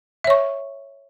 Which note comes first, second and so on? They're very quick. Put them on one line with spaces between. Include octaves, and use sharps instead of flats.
E5 C#5 C#6